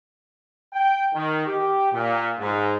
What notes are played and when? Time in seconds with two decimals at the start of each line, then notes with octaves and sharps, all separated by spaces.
0.73 G5
1.15 D#3
1.47 G4
1.93 A#2
2.39 G#2